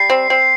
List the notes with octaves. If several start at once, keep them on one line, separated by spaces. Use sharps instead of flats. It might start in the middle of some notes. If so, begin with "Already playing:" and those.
Already playing: G3 C7
C4
C4